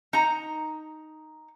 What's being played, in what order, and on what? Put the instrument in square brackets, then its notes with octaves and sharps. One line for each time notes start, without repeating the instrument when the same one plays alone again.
[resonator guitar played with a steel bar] D#4 A#5